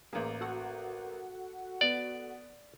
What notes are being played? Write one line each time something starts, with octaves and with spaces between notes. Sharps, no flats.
A1 A#3 G#4
F#4 A4 F#5
B3 D5